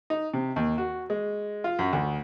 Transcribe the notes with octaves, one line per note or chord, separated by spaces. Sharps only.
D#4
C3
D#2
F#4
G#3
F4
F#2
D2